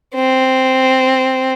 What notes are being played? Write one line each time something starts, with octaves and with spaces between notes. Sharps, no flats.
C4